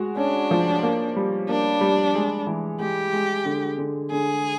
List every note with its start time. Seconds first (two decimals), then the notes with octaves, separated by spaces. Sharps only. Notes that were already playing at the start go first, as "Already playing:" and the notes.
Already playing: G#3 F#4
0.17 C#4 D4
0.51 F3
0.83 A#3
1.16 G3
1.49 A#3 D4
1.81 G3
2.15 G#3
2.47 E3
2.79 G#3 G4
3.13 G#3
3.45 D3
3.78 D3
4.12 D3 G#4